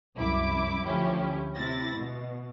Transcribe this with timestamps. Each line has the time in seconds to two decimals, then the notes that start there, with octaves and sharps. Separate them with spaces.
0.16 C2 F#2 E4 D6
0.85 D2 F3 C#4 E4 G4
1.55 C3 E4 A6 A#6
1.97 B2